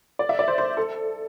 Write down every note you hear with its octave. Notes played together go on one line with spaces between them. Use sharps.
D5
E5
D5
C5
C5
A4